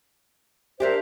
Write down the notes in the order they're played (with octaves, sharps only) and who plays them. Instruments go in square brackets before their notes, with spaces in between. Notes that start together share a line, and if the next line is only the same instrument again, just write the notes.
[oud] A#3 D4 G4 [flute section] A#4 C5 E5